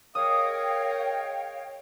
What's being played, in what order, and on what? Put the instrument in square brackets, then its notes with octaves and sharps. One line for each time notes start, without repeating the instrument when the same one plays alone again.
[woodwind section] G#4 A#4 D#5 [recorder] C#5 [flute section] F5 G5 [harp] D#6